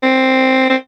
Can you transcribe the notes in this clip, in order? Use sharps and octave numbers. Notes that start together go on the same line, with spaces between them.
C4
C4